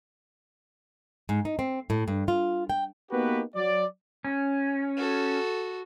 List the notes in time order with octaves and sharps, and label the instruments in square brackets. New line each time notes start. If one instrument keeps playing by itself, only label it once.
[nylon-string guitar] G#2
D#4
C4
A2
G2
F4
G5
[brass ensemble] A#3 B3 D#4 F#4 G4 B4
F#3 D5
[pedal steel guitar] C#4
[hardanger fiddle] F#4 A4